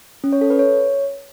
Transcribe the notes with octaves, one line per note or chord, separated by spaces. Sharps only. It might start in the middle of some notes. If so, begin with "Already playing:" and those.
C#4
C#5
A4
B4
C#5